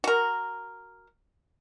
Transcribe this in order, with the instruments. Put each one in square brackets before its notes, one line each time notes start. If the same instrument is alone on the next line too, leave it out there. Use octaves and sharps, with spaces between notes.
[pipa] F#4 A#4